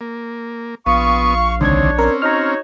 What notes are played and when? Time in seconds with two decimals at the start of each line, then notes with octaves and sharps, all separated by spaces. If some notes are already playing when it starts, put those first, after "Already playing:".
0.01 A#3
0.86 A#1 B3 F4 F5 C#6 D#6
1.61 C#2 D3 D#3 C4 D4 C#5 G#6
1.98 C4 C#4 A#4
2.22 D#4 F#4 C#5 A#5 F6